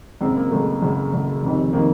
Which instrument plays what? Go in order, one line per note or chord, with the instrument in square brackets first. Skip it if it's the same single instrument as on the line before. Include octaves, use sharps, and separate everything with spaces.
[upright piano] F#1 F#2 C#3 C4
A#3
F#1 F#2 C#3 A3
F#1 F#2 C#3
F#1 F#2 C#3
F1 F2 C3 D#3
C3 D#3 A#3